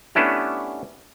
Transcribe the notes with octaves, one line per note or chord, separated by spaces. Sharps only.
A3 B3 C#4 D4 E4 G4